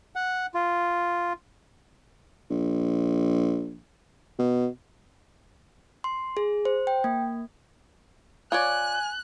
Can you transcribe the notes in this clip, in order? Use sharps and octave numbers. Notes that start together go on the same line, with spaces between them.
F#5
F4
A#1
B2
C6
G#4
C5
G5
A#3
F4 C#5 D5 G#5 F#6